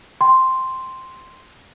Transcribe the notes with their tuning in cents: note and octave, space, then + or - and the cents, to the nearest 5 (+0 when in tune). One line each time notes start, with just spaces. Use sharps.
G5 +0 C6 +0